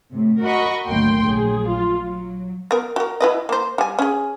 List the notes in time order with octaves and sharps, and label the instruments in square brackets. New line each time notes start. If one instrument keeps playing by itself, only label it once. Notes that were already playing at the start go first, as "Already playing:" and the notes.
[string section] A2 C3
F#4 A#4 D#5 F#5 B5 C#6
G#1 D2 F#3 A#3 G5 C6
A#1 F#3 G#4
F4
F#3
[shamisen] B3 A#4
F#4 A#4
E4 B4 D#5
A#3 C5
G3 G#5
C#4 G#4